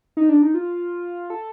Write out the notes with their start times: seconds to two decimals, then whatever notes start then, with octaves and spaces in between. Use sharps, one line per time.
0.17 D#4
0.29 D4
0.42 D#4
0.54 F4
1.30 A4